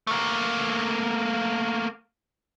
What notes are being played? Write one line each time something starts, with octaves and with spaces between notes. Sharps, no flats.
A3 A#3